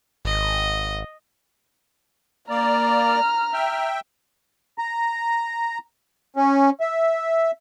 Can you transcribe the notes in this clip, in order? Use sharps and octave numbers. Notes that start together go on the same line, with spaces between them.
G#1 D#5
A#3 D5 A#5 F6
E5 G5
A#5
C#4
E5